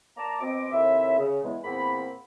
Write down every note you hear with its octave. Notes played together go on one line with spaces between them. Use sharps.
A#3 D5 A5 A#5
B2 C4 D#5 D6
D#2 A2 C3 E4 E5
C#3
E2 G#3
E2 A#2 A#3 C4 F#5 B5